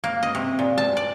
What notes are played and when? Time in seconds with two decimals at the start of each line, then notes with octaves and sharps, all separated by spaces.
0.04 A#3
0.23 D#5
0.35 C3
0.59 A#2
0.78 A5
0.97 D5